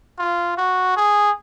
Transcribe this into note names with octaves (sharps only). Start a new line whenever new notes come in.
F4
F#4
G#4